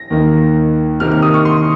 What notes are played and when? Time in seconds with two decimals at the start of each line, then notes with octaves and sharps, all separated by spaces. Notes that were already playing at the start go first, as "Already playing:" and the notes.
Already playing: A#6
0.10 D#2 D#3 A#3 D#4
1.00 C3 D#3 A#3 F6
1.12 F6
1.22 D#6
1.34 C#6
1.45 C6